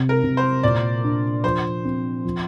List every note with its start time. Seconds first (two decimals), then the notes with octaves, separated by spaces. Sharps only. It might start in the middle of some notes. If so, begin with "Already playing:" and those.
Already playing: C3
0.09 A#4
0.23 C3
0.37 C5
0.63 A#2 D5
1.04 D4
1.44 F3 C5
1.85 C4
2.24 F3